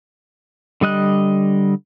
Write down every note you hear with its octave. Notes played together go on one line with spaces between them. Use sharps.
D3 G3 D#5 F#6